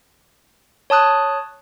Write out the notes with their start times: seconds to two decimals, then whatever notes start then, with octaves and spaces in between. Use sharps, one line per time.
0.90 C#5 A5 D#6 F#6